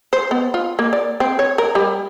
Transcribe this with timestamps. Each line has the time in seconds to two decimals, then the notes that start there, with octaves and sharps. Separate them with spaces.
0.13 C5
0.31 B3
0.54 F4
0.79 A#3
0.93 D5
1.20 C4
1.39 C#5
1.58 A#4
1.75 G3